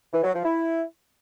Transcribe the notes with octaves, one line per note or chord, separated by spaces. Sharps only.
E3
F#3
F3
E4